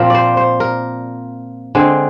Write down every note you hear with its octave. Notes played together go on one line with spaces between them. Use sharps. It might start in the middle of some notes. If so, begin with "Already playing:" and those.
Already playing: A#2 F3 C4 A#4
C5 D5
C5
A#4
D3 G#3 C4